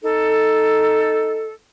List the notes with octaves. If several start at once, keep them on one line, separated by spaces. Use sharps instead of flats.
D#4 A4